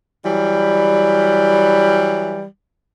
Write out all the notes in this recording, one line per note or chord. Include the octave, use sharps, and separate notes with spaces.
E3 F#3 G3